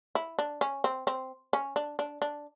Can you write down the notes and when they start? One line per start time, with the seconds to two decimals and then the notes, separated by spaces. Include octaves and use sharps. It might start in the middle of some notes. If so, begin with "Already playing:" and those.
0.15 E4
0.39 D4
0.61 C#4
0.84 C4
1.07 C4
1.53 C#4
1.76 D4
1.99 D4
2.22 D4